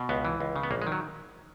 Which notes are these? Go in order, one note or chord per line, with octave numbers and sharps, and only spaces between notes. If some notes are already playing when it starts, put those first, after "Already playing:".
Already playing: B2
C#2 B3
E3
C#2
C#3
B3
A#1 A#3
G#3
D#3
F#3